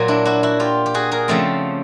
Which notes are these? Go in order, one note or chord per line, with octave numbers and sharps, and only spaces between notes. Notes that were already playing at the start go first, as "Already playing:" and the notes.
Already playing: A#2 F#3 A#3
D4 E4
E4 F#4
E4 F#4
F4 G4
G4
F#4 G#4
G#4 A#4
C#3 F3 A3 C4 G4 A4